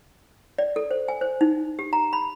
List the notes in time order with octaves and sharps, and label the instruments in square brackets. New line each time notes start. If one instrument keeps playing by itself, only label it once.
[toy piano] D5
A4
C5
G#5
C5
D#4
G4
A#5
B5